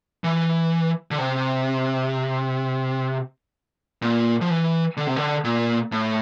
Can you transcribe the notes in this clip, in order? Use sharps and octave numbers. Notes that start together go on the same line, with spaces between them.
E3
D3
C3
A#2
F3
E3
D3
C3
D3
A#2
A2